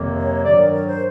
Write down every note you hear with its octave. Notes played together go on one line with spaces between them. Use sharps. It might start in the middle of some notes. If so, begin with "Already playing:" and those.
Already playing: F2 C3 D#3 F#3 A#3
C#5
G2 D#3 F#3 D5
A#4
A#4
C5